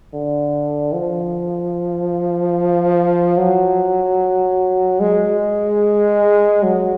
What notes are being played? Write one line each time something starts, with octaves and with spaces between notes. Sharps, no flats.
D3
F3
F#3
G#3
F#3